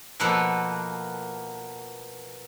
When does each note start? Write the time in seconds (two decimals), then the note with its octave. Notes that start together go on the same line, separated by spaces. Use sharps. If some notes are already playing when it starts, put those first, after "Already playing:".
0.20 B2 F3 A#3 B3 A4 F#5